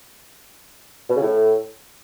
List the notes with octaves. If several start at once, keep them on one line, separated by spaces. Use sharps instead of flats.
B2
C#3
A2